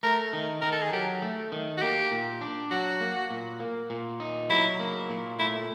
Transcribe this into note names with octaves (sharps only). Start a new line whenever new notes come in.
A3 A#4
D#3
D#3 A#4
A4
G#4
F#3 G4
A3
D#3
F#4
A#3 G4
A#2
D4
F#3 F#4
A#3
A#2
A#3
A#2
D#4
F#3 E4
A#3
A#2
A3 E4